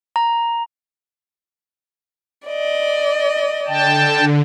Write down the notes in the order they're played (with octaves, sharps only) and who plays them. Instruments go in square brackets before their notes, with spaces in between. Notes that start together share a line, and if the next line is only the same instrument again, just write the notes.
[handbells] A#5
[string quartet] D5 D#5
[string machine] D3 [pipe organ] G5 A5